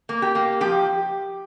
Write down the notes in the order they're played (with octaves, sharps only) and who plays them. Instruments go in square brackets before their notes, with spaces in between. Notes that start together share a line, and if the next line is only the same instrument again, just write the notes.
[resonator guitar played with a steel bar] A#3
G4
A#3
F3 G4